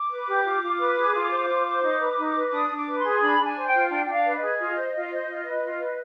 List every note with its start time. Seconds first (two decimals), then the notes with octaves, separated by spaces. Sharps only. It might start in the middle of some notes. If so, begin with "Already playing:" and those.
Already playing: D6
0.10 B4
0.28 G4
0.45 F4
0.62 F4
0.80 B4
0.97 G#4
1.14 F4
1.31 C5
1.48 F4
1.66 C5
1.83 D#4
2.00 B4
2.18 D#4
2.35 B4
2.49 D6
2.52 D4 D#6
2.70 D4
2.75 D6
2.87 B4
2.98 C6
3.03 G#4
3.21 D4 B5
3.38 D4
3.45 G#5
3.56 C5
3.67 G5
3.74 F4
3.90 D4 G5
4.05 D4 G5
4.13 F5
4.25 B4
4.37 D#5
4.42 G#4
4.59 F4
4.76 C5
4.94 F4
5.11 C5
5.28 F4
5.45 B4
5.63 F4
5.79 B4